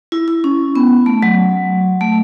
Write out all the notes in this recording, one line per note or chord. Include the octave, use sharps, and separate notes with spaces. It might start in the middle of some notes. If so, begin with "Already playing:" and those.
E4
E4
C#4
B3
A3
F#3
A3